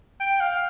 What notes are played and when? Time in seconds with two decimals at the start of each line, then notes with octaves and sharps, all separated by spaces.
0.20 G5
0.40 F5